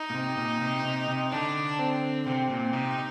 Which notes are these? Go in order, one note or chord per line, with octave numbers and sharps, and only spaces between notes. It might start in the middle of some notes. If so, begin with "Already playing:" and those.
Already playing: D#4
A#2
C3
A#2
C3
C3
C3
D3 D4
C4
C3 C4
A#2
C3 D#4